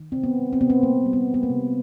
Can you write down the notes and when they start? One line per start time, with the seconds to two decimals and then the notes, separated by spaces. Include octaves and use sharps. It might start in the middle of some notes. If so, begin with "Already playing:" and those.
Already playing: D#3
0.12 C3 C4
0.24 B3
0.38 G3
0.53 C4
0.61 C3 B3
0.70 C4
0.83 G3 A#3
1.06 G3
1.13 B3
1.27 C3
1.34 B3
1.43 A#3
1.50 C3